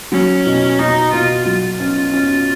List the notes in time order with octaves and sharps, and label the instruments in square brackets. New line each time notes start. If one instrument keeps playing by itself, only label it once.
[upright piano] F#3 [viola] C#4
[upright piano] B2
[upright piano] B2 [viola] D#4
[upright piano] B2 [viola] F4
[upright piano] F#3 [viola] F4
[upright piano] C#4
C#4